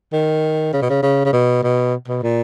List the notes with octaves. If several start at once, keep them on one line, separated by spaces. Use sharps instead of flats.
D#3
C#3
B2
C#3
C#3
C#3
B2
B2
B2
A#2